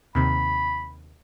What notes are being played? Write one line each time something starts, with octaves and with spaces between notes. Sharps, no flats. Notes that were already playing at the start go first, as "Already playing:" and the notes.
D#2 C3 B5